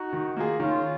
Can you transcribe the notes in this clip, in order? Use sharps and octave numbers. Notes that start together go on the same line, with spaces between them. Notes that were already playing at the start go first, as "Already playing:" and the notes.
Already playing: D#4 F#4
D#3
A#3 F4 G#4
D#3 C#4 F4